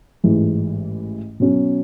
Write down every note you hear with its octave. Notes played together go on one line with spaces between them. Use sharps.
A1 G#2 E3
B2 F#3 C#4